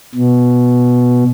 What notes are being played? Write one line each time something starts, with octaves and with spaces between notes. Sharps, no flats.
B2